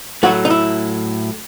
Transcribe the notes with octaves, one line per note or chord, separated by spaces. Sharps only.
A2 F#3 A3 F#4
D#4
E4